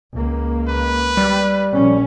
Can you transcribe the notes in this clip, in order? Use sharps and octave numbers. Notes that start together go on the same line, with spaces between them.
C#2 A#3
B4
G3
A#1 C#4